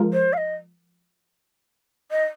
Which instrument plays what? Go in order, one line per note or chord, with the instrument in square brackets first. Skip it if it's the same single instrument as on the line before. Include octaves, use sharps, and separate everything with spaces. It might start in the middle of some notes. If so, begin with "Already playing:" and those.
Already playing: [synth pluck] F3 G#3 F4 A#4
[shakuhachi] C5
F5
D#5
D#5